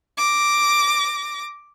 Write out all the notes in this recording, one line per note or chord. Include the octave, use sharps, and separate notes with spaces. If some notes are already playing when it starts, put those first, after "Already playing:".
D6 A#6